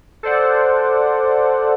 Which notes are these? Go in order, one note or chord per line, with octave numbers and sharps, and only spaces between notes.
A4 C5 D5 F#5